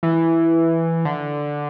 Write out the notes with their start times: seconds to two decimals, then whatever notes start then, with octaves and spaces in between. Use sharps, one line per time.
0.03 E3
1.05 D3